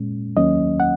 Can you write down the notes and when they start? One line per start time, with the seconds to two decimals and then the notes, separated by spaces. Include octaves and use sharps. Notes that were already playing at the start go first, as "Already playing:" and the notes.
Already playing: A#2 G#3 C#4
0.36 D#2 D#3 F#3 A#3 C#4 D#5
0.80 F#5